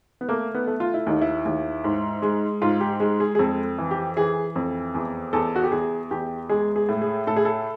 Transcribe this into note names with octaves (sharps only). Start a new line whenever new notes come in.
B3
A3 A#3
B3
A3
F4
E4
D#2 D#4
E4
D#2
G#2
G#3
G#2 F4
G4
G#3
G#4
G#4
F2 A4
E3
G4
E3 G#4
F2
E2
E2 A4
F#4
G4
E2 G#4
E2 G4
G#3 G#4
G#4
A2
G#4
A2 A4
G#4
A4